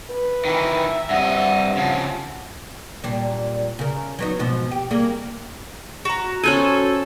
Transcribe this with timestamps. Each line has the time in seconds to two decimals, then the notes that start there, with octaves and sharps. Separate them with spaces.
0.10 B4
0.45 D#3 E3 E5
1.10 G2 C3 D#5 F#5
1.77 C#3 F3
3.04 A#2 G3 D4
3.79 C#3 A#4
4.19 F#3 B3 D#4
4.39 G#2 B2 F3
4.71 G4
4.91 G3 A#3 G#4
6.05 F#4 A#5
6.43 C#4 A4 C5 G#5